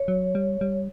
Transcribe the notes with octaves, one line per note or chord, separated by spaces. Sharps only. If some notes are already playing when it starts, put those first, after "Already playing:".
Already playing: C#5
F#3
G3
G3